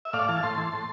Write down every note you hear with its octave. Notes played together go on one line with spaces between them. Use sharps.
E5
A2 D5 F5
E3 F5 A5
A2 A5 C6
E3
A2